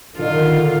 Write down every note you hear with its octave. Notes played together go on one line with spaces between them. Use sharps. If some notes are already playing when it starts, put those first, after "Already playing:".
D3 D#3 F4